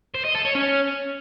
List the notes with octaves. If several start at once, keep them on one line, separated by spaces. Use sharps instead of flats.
C5
D#5
A4
C#5
C#4